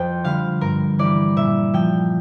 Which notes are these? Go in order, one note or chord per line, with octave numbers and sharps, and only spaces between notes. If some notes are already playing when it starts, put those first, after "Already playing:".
Already playing: F2 C5 G5
D3 G3 F5
G2 A#4
E3 G3 D5
A#2 E5
F3 G5